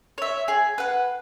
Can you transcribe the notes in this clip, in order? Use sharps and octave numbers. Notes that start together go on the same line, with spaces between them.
C#5 E5
G#4
B4 F#5